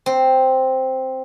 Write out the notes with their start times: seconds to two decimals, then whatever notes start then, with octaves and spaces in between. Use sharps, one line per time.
0.06 C4